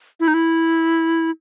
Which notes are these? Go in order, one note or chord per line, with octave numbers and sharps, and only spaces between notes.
E4
D#4
E4